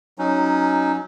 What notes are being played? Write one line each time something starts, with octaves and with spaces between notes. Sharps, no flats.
F#3 C#4 D#4